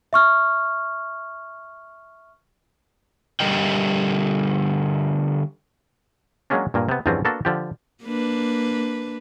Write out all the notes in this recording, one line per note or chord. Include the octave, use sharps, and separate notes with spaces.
E5 C#6 F6
D3 G3 G4 A#4 D#5 G5
F#3 G#3 A#3 C#4 D4
G2 A#2 A#3
C3 B3
E2 G2 D3 F3 C4 C#4
A#3 B3 D4 F#4 A4
D3 F3 G4
A#3 D4 B4